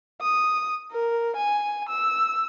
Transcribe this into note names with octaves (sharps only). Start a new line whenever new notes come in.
D#6
A#4
G#5
E6